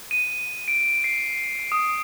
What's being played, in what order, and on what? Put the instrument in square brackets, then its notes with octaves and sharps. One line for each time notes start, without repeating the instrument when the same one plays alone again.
[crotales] D#7
D7
C7
D#6